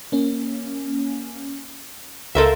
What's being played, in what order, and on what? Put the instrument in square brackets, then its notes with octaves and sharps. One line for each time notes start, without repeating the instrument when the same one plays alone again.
[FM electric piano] A#3 C#4
[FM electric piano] C#2 F5 C6 [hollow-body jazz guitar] A4 A#4 E5